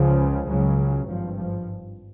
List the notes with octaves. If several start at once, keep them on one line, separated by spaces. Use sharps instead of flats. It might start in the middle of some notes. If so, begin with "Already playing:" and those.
Already playing: C#2 C#3 F3
C#2 C#3 F#3
G#1 G2 F3
F3